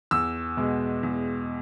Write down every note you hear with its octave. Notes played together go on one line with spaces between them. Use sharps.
E2 E6
B2 G#3
E2